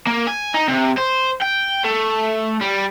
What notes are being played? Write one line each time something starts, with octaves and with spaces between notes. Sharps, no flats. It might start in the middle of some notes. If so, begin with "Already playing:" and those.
A#3
G#5
D#4
C3
C5
G5
A3
G3